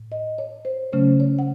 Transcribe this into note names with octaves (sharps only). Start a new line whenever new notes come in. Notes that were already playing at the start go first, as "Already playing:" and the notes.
Already playing: A2
D#5
C#5
C5
C#3 F#3 A3 C#4 C5
C#5
F#5